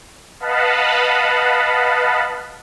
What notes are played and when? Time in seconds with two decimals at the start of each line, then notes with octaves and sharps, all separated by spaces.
0.40 B4 D#5 F5 F#5 A5 B5